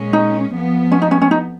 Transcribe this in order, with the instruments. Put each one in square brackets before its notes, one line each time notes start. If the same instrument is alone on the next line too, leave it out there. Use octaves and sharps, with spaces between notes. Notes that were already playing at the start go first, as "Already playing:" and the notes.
Already playing: [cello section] A#2 G#3 C#4
[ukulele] D#4
[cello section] F2 F3 B3
[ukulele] C#4
D#4
C#4
C#4
D#4